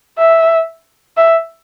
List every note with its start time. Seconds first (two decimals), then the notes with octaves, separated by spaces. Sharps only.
0.18 E5
1.17 E5